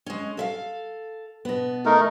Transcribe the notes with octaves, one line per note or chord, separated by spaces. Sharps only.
G#3 C#4
A4 E5 F5
B2 B3
A3 D#4 A#4